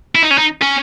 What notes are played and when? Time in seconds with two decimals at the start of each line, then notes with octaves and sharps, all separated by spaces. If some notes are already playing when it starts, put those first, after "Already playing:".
0.15 E4
0.23 D#4
0.31 C#4
0.38 D#4
0.62 C#4